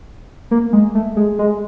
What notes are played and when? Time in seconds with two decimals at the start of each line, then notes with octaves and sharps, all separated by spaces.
0.51 A#3
0.73 G#3
0.95 A3
1.17 G#3
1.39 G#3